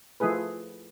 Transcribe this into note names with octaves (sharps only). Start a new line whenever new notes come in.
F3 A3 E4 G#4 B4